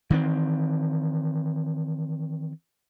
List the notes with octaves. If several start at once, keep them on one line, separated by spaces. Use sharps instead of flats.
D#3 E3 A#3 C4